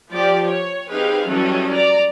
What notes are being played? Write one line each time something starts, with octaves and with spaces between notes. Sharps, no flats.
F3 G4 D5
C#5
C4 D#4 G4 G#4 B4 F5
E3 F#3 G3 C#4 A4 D#5
D5 A#5